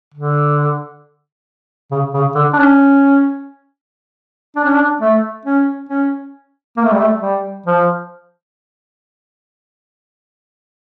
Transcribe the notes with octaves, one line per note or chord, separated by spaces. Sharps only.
D3
C#3
C#3
D3
D4
C#4
D4
C#4
D4
A3
C#4
C#4
A#3
A3
G3
A3
G3
F3